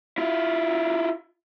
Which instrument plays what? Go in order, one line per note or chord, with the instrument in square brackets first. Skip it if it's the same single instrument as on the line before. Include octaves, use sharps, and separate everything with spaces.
[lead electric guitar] E4 F4